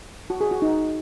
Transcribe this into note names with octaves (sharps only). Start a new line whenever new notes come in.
F#4
G#4
F#4
D#4